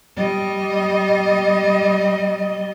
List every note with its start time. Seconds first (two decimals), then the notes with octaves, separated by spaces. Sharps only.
0.17 G3 D#5